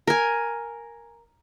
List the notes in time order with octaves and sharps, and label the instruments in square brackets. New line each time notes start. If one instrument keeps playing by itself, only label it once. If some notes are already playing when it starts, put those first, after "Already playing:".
[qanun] A#4 G#5